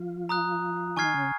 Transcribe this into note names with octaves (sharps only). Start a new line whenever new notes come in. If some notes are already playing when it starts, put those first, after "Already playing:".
Already playing: F3 F4
A#5 D#6 F#6
D#3 D#4 G#5 C#6 F6 G#6 C7
C#3 C#4